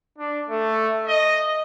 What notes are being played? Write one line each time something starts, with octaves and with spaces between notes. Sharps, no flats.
D4
A3
D#5